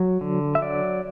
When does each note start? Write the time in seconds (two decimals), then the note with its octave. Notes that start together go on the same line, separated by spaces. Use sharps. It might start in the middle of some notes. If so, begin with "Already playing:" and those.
Already playing: F#3
0.21 D3
0.55 E5
0.62 F#3 D5